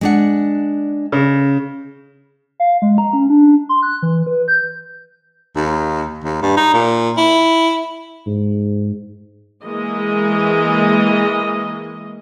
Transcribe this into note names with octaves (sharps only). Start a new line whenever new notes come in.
G#3 D4 F#5
C#3
F5
G#3
A#5
C#4
D4
C6
F#6
E3
B4
G6
D#2
D#2
G2
D#4
A#2
E4
G#2
E3 G#3 A#3 D#5